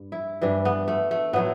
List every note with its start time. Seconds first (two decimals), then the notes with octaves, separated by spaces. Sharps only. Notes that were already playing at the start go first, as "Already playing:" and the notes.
Already playing: G2
0.12 E4
0.41 G2 E3 G3 D4
0.65 B3
0.88 A3
1.11 A3
1.33 A2 F#3 A3 B3